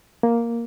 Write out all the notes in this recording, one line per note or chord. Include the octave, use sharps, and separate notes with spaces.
A#3